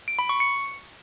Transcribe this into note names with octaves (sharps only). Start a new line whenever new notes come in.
D7
B5
C#6
C#7